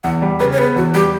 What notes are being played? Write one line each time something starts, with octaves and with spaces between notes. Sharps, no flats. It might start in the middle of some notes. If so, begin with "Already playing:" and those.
E2 F#5
G3
C#3 B4
C#5
B3 B4
E2 F#4
G3 G4